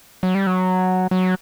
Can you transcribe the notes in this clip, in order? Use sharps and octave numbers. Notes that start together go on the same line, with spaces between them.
F#3
G3
F#3
F#3